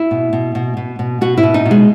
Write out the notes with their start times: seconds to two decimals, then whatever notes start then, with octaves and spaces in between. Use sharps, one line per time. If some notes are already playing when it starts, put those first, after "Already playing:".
Already playing: E4
0.11 B2
0.33 B2
0.55 B2
0.77 B2
0.99 B2
1.21 B2 F#4
1.38 E4
1.43 B2
1.54 D#4
1.65 B2
1.71 G#3